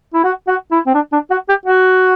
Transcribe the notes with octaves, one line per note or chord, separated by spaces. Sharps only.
E4
F#4
F#4
E4
C4
D4
D4
F#4
G4
F#4